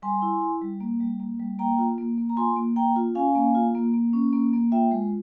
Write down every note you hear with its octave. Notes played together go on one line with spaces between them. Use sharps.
G3 G#5 C6
E4
E4
G3
A#3
G3
A#3
G3
A#3 G5 A#5
F4
A#3
A#3
A#5
F4 G#5 C6
A#3
A#3 G5 A#5
F4
C#4 F5 G#5
A#3
F4
A#3
A#3
C#4
A#3
A#3
F4 E5 G5
G#3